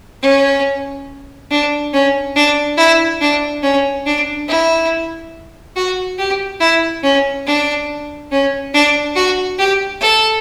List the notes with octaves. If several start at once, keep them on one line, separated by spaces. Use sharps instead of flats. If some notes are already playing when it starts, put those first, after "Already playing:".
C#4
D4
C#4
D4
E4
D4
C#4
D4
E4
F#4
G4
E4
C#4
D4
C#4
D4
F#4
G4
A4